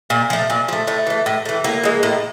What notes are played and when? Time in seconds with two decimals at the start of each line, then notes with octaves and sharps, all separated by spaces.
0.10 A#2
0.30 F3 A3
0.50 A#2
0.68 F3 A3
0.87 A2 A3
1.07 E3 A3
1.26 A2
1.45 E3 A3
1.64 A2 A#3
1.83 E3 G#3
2.03 A2